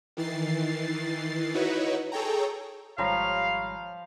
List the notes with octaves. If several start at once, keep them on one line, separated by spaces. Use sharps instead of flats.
D#3 E3 A6 C7
D#4 E4 F#4 B4 C#5
G#4 A4 C#5 G5 A#5
G#1 F3 G3 C#5 F5 A#5 B5